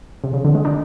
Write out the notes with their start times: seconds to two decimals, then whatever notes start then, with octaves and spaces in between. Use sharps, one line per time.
0.24 C3
0.33 C#3
0.45 D3
0.55 G#3
0.65 D4